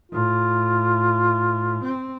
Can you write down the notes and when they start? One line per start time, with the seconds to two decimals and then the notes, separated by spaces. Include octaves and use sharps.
0.12 A2 F4
1.84 C4